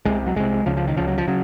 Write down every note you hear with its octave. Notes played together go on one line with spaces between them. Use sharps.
C2 C3 G#3
F#3
C2 C3 G#3
C#2 C#3 F3
F3
D#3
C#2 C#3 F3
F#3
F3
C#3 F#3